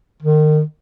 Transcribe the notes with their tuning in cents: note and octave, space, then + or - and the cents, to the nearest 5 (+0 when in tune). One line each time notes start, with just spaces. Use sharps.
D#3 -30